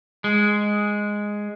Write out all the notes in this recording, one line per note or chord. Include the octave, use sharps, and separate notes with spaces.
G#3